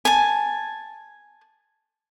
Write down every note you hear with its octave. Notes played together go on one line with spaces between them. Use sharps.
G#5 A5